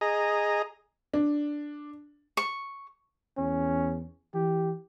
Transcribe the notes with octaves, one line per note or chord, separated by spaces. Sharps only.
G#4 D#5 A#5
D4
C#6
E2 C#4
E3 G4